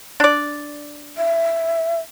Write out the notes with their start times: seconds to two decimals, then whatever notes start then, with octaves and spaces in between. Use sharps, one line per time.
0.20 D4 D5
1.17 E5